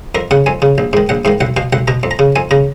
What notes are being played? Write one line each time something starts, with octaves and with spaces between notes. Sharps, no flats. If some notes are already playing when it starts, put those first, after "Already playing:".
F2 A#4
C#3 F#5
F2 G#5
C#3
A#1
G#2 D#3
A#1 F#5
G#2 D#3 F5
B1 F#5
B2 F5
B1 F#5
B2 A#5
F2
A#5
C#3
F2 G#5
C#3 A#5